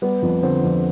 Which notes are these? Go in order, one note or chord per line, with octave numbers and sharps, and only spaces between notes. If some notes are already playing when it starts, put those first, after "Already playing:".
G3 B3
F2
D3 C4
F2